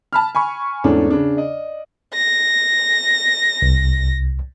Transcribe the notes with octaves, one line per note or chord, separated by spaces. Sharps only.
A5 B5 F6
G#5 B5 C#6
E2 G#2 A3 C#4 D4
C#3 D4
D5 D#5
A#6
C2